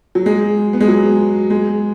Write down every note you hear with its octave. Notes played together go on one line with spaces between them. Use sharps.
F#3
G#3
B3
G#3
F#3
G#3